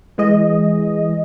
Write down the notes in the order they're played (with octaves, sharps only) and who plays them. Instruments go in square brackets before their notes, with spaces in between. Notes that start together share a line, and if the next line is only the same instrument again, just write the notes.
[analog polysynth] E3 G#3 D#5